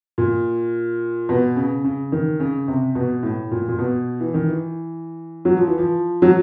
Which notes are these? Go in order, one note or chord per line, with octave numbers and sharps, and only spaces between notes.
A#2
B2
C#3
C#3
D#3
C#3
C3
B2
A2
A#2
A#2
B2
E3
D#3
E3
F#3
F3
E3
F3
F#3